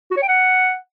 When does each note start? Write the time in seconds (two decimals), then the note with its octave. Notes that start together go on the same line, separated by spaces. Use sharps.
0.11 F#4
0.17 C#5
0.22 G5
0.28 F#5